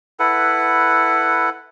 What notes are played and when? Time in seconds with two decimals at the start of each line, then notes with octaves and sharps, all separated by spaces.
0.19 E4 A4 B4 F#5